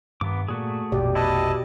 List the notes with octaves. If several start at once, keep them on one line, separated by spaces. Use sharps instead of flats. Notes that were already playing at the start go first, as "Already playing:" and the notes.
G2 D#3 B3 D6
A#2 A3 F#4 G#4
F1 A#1 B2 G4 D5
E4 B4 D#5 A5